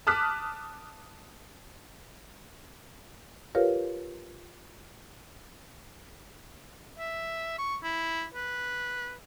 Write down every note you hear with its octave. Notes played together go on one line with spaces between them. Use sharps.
A5 D6 D#6 F6 F#6 B6
F4 G4 A#4 B4 C#5 F5
E5
C#6
E4
B4